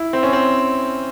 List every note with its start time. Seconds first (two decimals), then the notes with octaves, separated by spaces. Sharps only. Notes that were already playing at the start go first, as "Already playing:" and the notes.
Already playing: E4
0.13 C4
0.23 C#4
0.33 C4